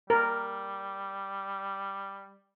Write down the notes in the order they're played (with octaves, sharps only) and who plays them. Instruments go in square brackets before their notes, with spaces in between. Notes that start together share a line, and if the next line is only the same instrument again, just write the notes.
[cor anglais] G3 [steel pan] A#4